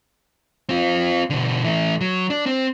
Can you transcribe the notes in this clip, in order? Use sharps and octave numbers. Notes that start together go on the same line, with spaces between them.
C4 F4
B2 D3
E3 A3
F#3
D4
C4